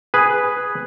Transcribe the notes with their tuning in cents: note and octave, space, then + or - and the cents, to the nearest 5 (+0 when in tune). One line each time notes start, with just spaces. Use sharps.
G#4 +0 B4 +0